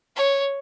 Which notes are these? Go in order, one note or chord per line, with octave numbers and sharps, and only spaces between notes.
C#5